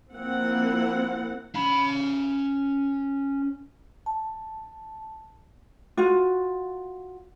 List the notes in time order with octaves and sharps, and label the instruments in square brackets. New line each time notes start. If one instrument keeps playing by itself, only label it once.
[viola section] F3 A#3 C4 E4 F4 F#5
[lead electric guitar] C#4 B5
[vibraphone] A5
[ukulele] F4 F#4